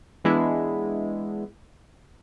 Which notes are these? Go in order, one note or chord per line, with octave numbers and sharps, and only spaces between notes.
E3 G#3 B3 D4 E4